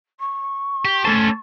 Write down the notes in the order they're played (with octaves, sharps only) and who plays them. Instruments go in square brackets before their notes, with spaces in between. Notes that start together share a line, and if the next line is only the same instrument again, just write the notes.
[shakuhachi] C#6
[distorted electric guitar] G4
[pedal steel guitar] A3 A4 A5 [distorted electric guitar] C#4 C5